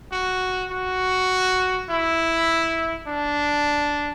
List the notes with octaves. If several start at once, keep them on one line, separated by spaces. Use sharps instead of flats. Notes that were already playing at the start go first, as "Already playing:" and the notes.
F#4
F#4
E4
D4